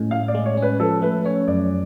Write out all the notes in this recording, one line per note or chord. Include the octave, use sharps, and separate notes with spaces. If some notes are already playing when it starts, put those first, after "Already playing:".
Already playing: A2 G#3 C#4
A2 F5
D5
G#3
C#5
C#4
B4
F3 A4
A3 B4
C#4 C#5
F#2 D5